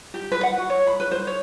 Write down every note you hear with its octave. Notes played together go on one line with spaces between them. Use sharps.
G4
B4
F#5
F#4
C#5
B5
B4
C5
C#5